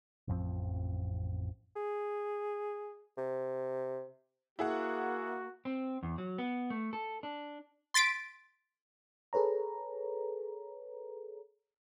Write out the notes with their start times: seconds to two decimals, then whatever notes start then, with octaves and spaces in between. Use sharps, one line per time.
0.28 A1 F2 F3 C4
1.76 G#4
3.17 C3
4.59 A#3 E4 F#4 G#4 F#5
5.65 C4
6.03 E2
6.18 F#3
6.38 B3
6.70 A3
6.93 A4
7.23 D4
7.94 C6 A6 B6 D7
9.33 G#4 A4 B4 C#5 A#5